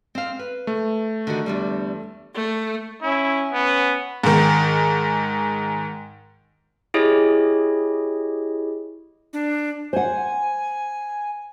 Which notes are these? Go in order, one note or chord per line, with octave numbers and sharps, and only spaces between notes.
C4 F5
B4
A3
D3 D#3 F#4
E2 D3 G3
A3
C#4 E4
B3 C#4
G#2 D#3
E4 G4 G#4 C#5 D#5
D4
C5 F#5 G#5